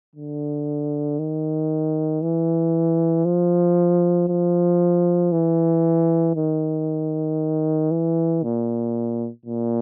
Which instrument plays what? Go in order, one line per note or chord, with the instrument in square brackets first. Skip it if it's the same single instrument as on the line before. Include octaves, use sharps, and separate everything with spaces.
[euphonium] D3
D#3
E3
F3
F3
E3
D#3
E3
A#2
A#2